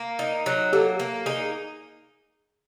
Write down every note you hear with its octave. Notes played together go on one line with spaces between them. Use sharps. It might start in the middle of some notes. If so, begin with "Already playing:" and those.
Already playing: A#3
D#4
F#3
A#3 G4 A4
A#3
D#4 G#4